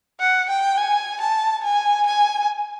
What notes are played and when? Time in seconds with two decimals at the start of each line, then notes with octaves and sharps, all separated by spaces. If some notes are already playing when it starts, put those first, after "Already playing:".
0.20 F#5
0.50 G5
0.77 G#5
1.21 A5
1.64 G#5
2.06 G#5